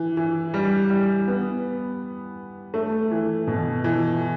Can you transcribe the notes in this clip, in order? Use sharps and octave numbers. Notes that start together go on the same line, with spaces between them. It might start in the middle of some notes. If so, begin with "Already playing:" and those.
Already playing: E3
E3
G3
G3
B3
A3
E3
B2
E3